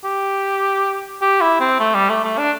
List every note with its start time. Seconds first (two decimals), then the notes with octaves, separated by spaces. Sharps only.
0.04 G4
1.22 G4
1.41 E4
1.60 C4
1.80 A3
1.95 G3
2.10 A3
2.24 A3
2.38 D4